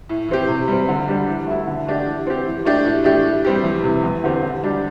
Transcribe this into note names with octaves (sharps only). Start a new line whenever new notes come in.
A2
E3 C4 G4
C3
G3 C4
D3
G3 D4 G4
E3
A3 E4
D3
A3 D4 G4
E3
C4 G4
E3
A3 D4 G4
A2
E3 A3 D4 G4
A2
G3 C4 G4
E2
C3 E3
E2
D3 C4 G4
D3
G3 D4 G4